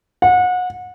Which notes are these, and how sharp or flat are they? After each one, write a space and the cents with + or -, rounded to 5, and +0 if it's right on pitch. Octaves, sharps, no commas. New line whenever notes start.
F#5 -30